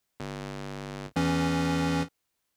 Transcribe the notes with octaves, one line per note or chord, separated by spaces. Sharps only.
G1
E2 E3 C#4